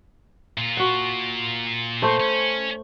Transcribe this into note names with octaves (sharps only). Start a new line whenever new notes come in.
A#2 F4
F#4 F#5
A3 C5
C#4